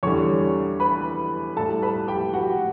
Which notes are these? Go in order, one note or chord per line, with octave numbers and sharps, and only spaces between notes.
E2 D3 G3 C#5 C#6
B4 B5
A2 G3 A4 A5
B4 B5
G4 G5
F#4 F#5